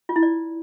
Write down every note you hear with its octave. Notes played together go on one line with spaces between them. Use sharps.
F4
E4
D5